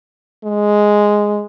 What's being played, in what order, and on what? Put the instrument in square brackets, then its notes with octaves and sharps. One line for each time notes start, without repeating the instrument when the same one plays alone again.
[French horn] G#3